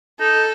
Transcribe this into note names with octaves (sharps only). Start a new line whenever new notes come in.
D#4 A4